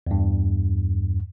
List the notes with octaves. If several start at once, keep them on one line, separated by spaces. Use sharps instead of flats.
E2 G2